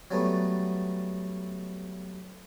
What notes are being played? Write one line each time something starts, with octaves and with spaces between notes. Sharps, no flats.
F#3 G3 A3 B3